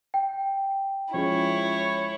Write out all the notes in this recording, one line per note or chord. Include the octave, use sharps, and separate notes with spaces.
G5
F3 G#3 C#4 E4 C#5